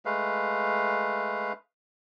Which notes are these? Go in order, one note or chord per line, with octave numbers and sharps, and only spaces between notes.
G#3 A3 B4 F5